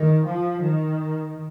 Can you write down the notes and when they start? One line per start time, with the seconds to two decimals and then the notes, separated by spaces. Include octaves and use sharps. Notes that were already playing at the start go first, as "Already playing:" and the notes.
Already playing: D#3
0.27 F3
0.62 D#3